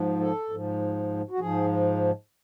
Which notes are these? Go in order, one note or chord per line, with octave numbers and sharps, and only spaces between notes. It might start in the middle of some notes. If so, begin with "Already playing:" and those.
Already playing: G#2 F3
A4
G#2 F3
F#4
G#2 F3 G#4